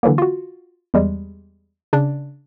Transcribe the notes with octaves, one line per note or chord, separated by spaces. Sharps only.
D3 E3 F#3 A#3
F4 F#4
E2 G3 G#3
C#3 D4